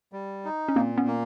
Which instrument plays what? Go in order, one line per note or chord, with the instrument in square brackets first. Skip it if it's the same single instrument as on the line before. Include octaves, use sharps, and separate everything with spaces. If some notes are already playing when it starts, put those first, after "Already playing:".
[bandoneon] G3
D#4
[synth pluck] C#4
[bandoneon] A#2 [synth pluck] A#3 C4
[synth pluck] B3 C#4
[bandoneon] A#3